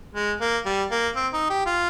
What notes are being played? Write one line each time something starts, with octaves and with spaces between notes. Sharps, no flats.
G#3
A#3
G3
A#3
C4
D#4
G4
F4